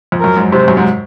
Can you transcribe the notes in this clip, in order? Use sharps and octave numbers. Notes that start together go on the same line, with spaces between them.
F2
F#2 A#4
G#2
C3 C5
F#2
G#2